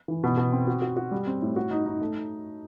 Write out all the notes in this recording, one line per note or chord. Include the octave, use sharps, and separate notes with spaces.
E3
B2
B2
C4
F#4
F#4
F#4
G3
C4
A2
F#4
D#4
D#4
A3